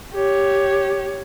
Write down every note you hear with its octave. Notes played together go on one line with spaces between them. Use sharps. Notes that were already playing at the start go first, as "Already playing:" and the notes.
G4 C#5